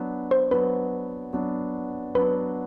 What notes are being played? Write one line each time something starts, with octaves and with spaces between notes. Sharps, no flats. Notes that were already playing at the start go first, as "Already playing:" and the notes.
Already playing: F#3 B3 D4
C5
F#3 B3 D4 B4
F#3 B3 D4
F#3 B3 D4 B4